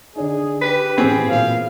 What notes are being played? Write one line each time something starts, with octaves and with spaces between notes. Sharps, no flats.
D3 D4 D#4 G#4
G4 B4
A2 E3 B3 C4 G#4
A#2 F#3 F5